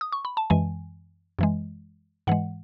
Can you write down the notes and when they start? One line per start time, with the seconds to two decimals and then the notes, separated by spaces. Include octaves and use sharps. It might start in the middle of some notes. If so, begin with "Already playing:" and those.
0.01 D#6
0.12 C#6
0.25 B5
0.37 A5
0.50 F#2 E3 G#3 G#5
1.39 F#2 E3 G#3
2.27 G#2 E3 G#3 F#5